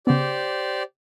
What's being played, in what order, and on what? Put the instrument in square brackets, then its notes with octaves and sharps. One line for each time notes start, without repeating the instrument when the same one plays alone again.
[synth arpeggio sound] C#3 B3 [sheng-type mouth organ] G4 C5 D5